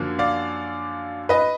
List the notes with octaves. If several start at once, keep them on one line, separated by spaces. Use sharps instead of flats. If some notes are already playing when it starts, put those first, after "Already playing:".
Already playing: F#2 D3 F3 A#3
D5 F5
B4 D#5